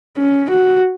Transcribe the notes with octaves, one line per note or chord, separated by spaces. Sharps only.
C#4
F#4